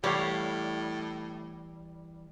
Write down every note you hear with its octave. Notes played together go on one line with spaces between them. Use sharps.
A2 E3 G3 G4 C#5 F5